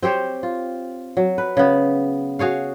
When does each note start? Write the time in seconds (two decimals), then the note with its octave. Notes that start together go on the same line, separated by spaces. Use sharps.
0.03 C4 G4 C5 C#5
0.43 F4
1.17 F#3
1.38 B4
1.57 C#3 B3
2.39 F#4 G#4 C#5 F5